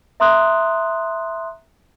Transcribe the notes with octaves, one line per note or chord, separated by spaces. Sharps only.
E5 A#5 C6 D#6 F#6